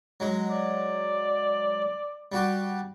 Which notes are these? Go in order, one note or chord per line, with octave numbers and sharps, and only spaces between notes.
F#3 G#3
D5
G3 F#4 G4